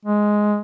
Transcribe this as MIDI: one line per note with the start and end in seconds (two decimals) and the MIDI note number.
0.05 0.59 56